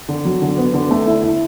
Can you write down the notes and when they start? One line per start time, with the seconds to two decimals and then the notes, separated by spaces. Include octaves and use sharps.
0.09 D3
0.25 F#3
0.42 D3
0.58 B3
0.74 D3
0.91 A3
1.06 E4
1.22 E4